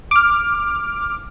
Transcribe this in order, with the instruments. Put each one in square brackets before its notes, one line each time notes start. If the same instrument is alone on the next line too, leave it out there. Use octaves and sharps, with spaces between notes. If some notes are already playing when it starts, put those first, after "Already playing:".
[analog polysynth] D6 F6